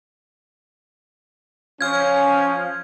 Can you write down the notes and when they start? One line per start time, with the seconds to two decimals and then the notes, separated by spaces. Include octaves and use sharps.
1.81 F3 C#4 F5 F6 G#6